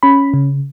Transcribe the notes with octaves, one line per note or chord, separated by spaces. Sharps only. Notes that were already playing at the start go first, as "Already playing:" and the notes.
C#4 B5
C#3